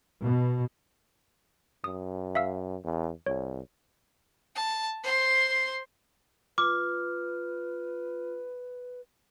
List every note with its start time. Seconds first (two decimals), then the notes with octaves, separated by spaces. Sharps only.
0.21 B2
1.84 F#2 D#6
2.35 E5 F5 E6
2.84 E2
3.26 C2 C#5
4.55 A5
5.03 C5 C6
6.58 F4 B4 D6